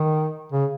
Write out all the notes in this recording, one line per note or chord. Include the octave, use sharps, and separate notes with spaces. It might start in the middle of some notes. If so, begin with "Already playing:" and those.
Already playing: D#3
C#3